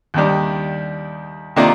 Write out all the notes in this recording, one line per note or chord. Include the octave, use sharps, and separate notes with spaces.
D#2 D#3 G3 D4
C3 D#3 A#3 D4 F4